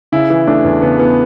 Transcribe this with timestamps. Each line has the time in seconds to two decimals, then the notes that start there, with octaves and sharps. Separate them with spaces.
0.12 C#3 E4
0.30 E3
0.47 A3 D4
0.64 E2
0.82 C#3 B3
0.99 E3 B3